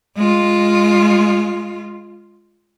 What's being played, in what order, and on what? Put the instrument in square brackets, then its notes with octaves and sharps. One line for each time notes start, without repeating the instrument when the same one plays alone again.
[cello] G#3 F4